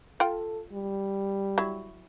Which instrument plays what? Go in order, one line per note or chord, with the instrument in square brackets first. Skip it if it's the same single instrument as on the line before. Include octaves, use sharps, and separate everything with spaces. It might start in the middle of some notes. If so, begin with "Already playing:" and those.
[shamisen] F4 G5 [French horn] A4
[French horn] G3
[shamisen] F#3 E4